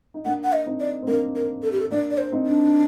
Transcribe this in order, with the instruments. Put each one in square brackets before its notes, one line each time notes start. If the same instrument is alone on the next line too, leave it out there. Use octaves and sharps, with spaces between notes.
[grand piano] D#4
[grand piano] A#3 D4 [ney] F#5
[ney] F#5
D#5
[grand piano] C4 D#4
[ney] D5
[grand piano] C4
[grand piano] A#3 D4 [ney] A#4
[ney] A#4
A4
G4
A4
[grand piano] A#3 D4 [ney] D5
[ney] D5
C5
[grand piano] C4 D#4
[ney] D4